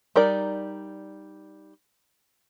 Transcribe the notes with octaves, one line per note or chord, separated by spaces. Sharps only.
G3 D#4 A#4 D5